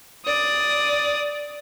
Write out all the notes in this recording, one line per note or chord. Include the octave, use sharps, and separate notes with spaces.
D5 D#6